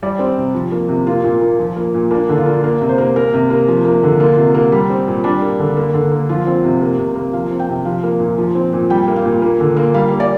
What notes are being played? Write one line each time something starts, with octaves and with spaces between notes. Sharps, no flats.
G3 D5
C4
C3
F3
A#3
C3
A#3 F4
A#2
A#3
F3
A#3
A#2
A#3 D4
D3 D4
F4
A#3
A#3
C3
C5
A#3
A#3 A#4
C3
A#3
F3
A#3
D3
A#3 F4
C3
A#3
G3
C4
A#2
G3 D4
A#3
D3
A#3
D3
A#3
F3 F4
C4
C3
A#3
C3
A#3
F3 F5
C4
G5
C3
F3 F5
A#3
A#2
F3
C4
A#2
G3 G5
A#3
F5
A#2
A#3
D3
A#3
G3 F5
A#3
D5